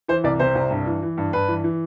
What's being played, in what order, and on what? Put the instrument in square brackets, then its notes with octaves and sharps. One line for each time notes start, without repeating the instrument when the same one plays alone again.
[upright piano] E3 C5
C2 D5
C3 C5
C2
G2
E3
E3
G2
G2 B4
E3
E3